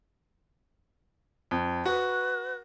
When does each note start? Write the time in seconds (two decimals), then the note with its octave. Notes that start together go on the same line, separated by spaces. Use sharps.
1.51 F2
1.86 F#4 B4